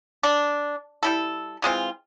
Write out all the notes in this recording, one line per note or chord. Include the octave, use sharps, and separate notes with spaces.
D4
G3 E4 A4
E3 G#3 C4 F4